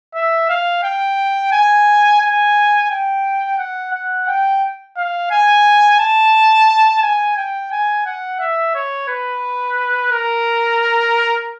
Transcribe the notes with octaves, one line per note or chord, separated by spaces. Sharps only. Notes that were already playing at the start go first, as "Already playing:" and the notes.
E5
F5
G5
G#5
G#5
G5
F#5
F#5
G5
F5
G#5
A5
G#5
G5
G#5
F#5
E5
C#5
B4
A#4